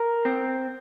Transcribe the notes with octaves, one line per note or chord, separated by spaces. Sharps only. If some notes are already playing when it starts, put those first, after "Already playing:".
Already playing: A#4
C4